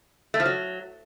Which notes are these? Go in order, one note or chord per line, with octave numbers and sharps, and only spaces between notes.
A3
F3
F#3